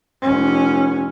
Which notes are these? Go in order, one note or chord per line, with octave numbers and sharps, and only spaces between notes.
F1 C#4